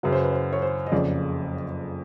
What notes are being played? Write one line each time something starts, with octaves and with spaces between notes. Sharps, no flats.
F#2 C#3 F#3 B4
C5
B4
C5
C#5
C5
D#5
F#1 F2 C#3 D5